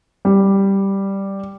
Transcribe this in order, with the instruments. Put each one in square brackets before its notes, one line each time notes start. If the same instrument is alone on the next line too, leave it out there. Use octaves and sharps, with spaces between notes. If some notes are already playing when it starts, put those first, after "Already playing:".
[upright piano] G3